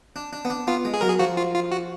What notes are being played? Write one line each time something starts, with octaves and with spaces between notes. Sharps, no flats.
D4
D4
B3
D4
B3 F4
G#3
G#4
F#3 A#4
G#4
F3 F#4
F4
F4
F#4